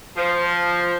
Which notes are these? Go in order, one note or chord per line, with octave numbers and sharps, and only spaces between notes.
F3